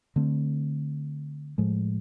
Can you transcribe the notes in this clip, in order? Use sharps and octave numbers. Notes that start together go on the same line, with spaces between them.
D3 A3 C4
A2 F3 G#3